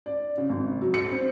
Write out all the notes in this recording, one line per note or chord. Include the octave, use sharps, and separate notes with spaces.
D5
C#3
G#1
F#3
C#7
C4